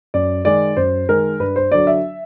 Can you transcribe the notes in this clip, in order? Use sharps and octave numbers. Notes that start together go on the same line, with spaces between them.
F#2 D5
D#3 G#3 D5
F#2 C5
D#3 G#3 A#4
G2 B4
C5
D3 F#3 D5
E5